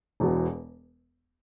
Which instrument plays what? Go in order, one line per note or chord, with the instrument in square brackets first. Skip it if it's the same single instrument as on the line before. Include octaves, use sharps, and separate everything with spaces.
[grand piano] E1 E2 B2